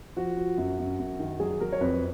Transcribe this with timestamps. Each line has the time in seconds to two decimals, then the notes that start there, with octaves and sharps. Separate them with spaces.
0.16 F3 F#4
0.37 F3
0.57 F#2
0.78 F#2
0.98 F#2
1.20 D#3
1.40 F#3 G#4
1.60 F#3 A#4
1.72 C#5
1.81 F2 B4